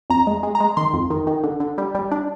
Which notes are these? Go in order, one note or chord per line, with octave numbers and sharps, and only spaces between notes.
F2 A#5
G#3
G#3
A#5
G#3
D#3 C6
F2
D#3
D#3
D3
D3
G3
G3
D4